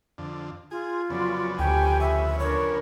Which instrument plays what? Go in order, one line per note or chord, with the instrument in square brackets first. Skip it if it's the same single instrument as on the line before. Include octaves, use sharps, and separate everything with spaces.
[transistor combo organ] F2 D3
[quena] F4 [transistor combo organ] G#4
[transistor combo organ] F2 C#3 B3 [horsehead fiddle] F#3 D5
[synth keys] D2 [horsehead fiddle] G4 G#5 [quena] G5
[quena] E5
[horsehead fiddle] D4 A#4 [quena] C#5